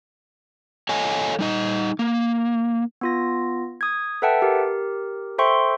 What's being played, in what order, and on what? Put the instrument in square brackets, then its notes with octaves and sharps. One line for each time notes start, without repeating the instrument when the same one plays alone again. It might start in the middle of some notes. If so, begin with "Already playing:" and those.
[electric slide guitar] A4 C#5 D#5 F5 G#5
G3 D#4 D#5
A#3
[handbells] B3 F4 A#6
D#6 G#6
A4 B4 E5 F#5 G5 A5
G4 A#4
A4 C5 E5 G5 C6 C#6